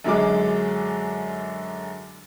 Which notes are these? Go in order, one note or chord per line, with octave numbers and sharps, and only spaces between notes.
F#2 D3 F#3 G#3 G#4 D6